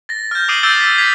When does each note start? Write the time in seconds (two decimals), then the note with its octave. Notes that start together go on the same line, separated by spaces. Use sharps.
0.09 A6 A#6
0.31 F6 G6
0.48 D6 D#6 C7 D7 D#7 F#7
0.63 D6 E6 G6 A6 D7 G7
0.81 E6 B6
0.98 G#6 A6 B6 C7 F7